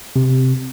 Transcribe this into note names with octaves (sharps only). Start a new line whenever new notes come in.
C3